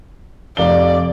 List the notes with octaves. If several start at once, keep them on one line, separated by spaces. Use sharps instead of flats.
F1 D5 F5 G7